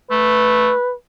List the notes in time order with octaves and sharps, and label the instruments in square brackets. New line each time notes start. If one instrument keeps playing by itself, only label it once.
[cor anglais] A3 [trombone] B4